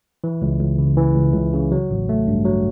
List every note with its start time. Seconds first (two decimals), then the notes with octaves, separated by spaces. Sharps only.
0.24 E3
0.42 C#2
0.61 C#2
0.78 C#3
0.97 E3
1.15 C#2
1.34 C#2
1.54 C#3
1.72 F#3
1.91 A1
2.09 A3
2.28 G2
2.45 F#3